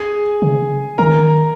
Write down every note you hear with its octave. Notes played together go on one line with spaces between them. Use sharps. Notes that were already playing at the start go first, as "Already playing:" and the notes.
Already playing: G#4 G#5
C#3
D#3 A#4 A#5